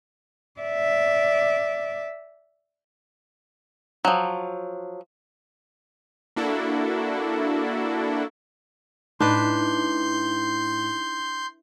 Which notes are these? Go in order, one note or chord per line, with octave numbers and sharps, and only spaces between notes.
D5 E5
F3 F#3
A#3 D4 E4 F#4 A4
A2 D4 D#4 B4 C6 G6